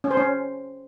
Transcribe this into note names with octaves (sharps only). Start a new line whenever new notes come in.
C#4
C5
C#4